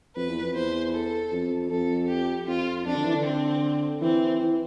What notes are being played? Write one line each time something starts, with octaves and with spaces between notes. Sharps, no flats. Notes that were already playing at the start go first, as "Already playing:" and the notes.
F2 B4
E2
F2
E2 C5
A4
F2
F2 A4
G4
F2 F4
F2 D4
D3
E3
D3
C4
E3 C4
E3